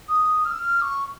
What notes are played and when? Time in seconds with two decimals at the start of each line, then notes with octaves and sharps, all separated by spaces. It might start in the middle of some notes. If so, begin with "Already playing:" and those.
0.08 D#6
0.44 F6
0.51 E6
0.58 F6
0.81 C#6